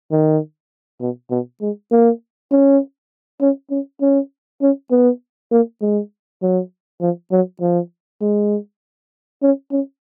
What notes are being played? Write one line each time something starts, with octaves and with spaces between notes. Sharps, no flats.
D#3
B2
B2
G#3
A#3
C#4
C#4
C#4
C#4
C#4
B3
A#3
G#3
F#3
F3
F#3
F3
G#3
C#4
C#4